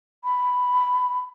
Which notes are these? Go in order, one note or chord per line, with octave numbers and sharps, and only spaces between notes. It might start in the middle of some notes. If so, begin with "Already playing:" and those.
B5